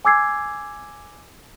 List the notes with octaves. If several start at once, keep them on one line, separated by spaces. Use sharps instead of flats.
G#5 D6 E6 G#6 C7